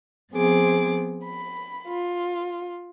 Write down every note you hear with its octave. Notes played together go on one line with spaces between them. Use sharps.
F3 B3 C4 G#4 D6
B5
F4